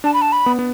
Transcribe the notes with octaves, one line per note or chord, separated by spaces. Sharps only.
D4 A5
B5
A5
B5
B3
B3